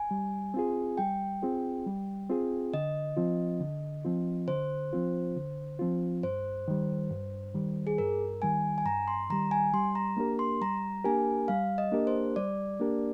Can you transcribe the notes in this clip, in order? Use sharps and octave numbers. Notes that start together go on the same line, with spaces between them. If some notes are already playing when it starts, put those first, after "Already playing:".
Already playing: G#5
G3
C4 F4 G#4
G3 G5
C4 F4 G#4
G3
C4 F4 G#4
D3 D#5
F3 C4 F4
D3
F3 C4 F4
D3 C5
F3 C4 F4
D3
F3 C4 F4
G2 C5
D#3 G3
G2
D#3 G3
G#4
G2 A#4
D#3 G3 G#5
G#5
G2 A#5
C6
D#3 G3 A#5
G#5
G3 C6
A#5
A#3 D4 G4 A#4
C6
G3 A#5
A#3 D4 G4 A#4 G#5
G3 F5
D#5
A#3 D4 G4 A#4
C5
G3 D5
A#3 D4 G4 A#4